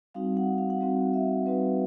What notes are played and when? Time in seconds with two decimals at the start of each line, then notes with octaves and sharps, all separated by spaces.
0.14 G3 C4 D#4 F#4 F5
0.37 F#5
0.58 F5
0.70 F#5
0.80 G3 C4 D#4 F#4 F5
1.14 E5
1.46 G3 C4 D#4 F#4 B4